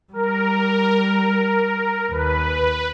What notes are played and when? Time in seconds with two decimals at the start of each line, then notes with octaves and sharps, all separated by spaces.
0.13 G3 A#4
2.11 D#2 B4